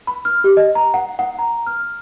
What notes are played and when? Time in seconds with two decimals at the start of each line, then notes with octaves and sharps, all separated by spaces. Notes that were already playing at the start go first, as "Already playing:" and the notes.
0.07 B5
0.25 F6
0.44 G4
0.57 D#5
0.75 A#5
0.94 F#5
1.19 F#5
1.39 A#5
1.67 F6